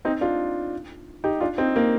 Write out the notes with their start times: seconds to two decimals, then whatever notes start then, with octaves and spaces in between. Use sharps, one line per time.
0.05 C4 D#4
0.21 D4 F4
1.24 D#4 G4
1.41 D4 F4
1.58 C4 D#4
1.76 A#3